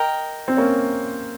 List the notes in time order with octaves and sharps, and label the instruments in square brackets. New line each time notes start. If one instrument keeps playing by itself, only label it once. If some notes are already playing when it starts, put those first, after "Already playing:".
Already playing: [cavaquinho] A#4 D#5 G5
[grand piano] C4
A#3 C#4